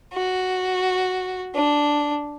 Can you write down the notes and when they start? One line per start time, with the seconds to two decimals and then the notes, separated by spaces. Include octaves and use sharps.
0.14 F#4
1.56 D4